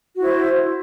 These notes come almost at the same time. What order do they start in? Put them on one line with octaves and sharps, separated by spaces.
F#4 E4 C5